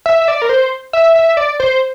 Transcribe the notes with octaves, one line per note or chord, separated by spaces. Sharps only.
E5
E5
D5
A#4
C5
E5
E5
D5
C5